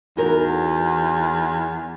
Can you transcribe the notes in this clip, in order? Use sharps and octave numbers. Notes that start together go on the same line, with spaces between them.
E2 D#4 F#4 A#4